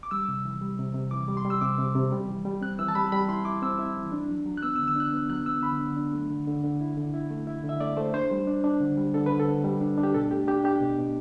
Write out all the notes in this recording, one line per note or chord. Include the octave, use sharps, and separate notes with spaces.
D6
G3 E6
C3
E3
G3
C3
C3
E3 D6
G3
C6
G3
E6
C3 D6
C3
C3
G3
E3
G3
C4 F#6
E3 E6
A5
G3 B5
G3 B5
E4 C6
E4 D6
C4 E6
E4
E3
D4
F#3
F#3
F#6
B3 E6
E6
D3
E6
D4 F#6
B3
F#3 F#6
B3 E6
D3 B5
D3
D4
A3
D3
D3
D3
E4
D3
E4
A3
E4
D3
E5
A3 D5
A3 C5
D4 C5
G3
D4
D4
D3
G3
D3 A4
D3 B4
A4
D3
G3
D4
D4
G4
B2 A4
A3 G4
D4 G4
D4 G4
B2
B2